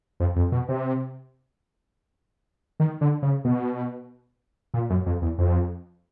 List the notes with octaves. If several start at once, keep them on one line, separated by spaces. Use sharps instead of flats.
F2
F2
B2
C3
D#3
D3
C#3
B2
A#2
F#2
F2
E2
F2